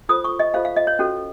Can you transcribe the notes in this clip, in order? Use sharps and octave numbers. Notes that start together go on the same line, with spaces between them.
F4 A4 C5 D#6
C#6
D#5
F4 A4 C5 F5
F5
D#5
C#5
C#4 F#4 A4